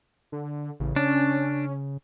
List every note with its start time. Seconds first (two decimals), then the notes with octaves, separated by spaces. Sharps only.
0.32 D3
0.80 A1 C#3
0.96 C#4 D4